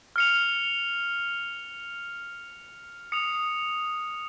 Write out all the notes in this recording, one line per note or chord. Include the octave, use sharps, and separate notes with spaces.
F6 C#7 F7
D#6 C#7 F7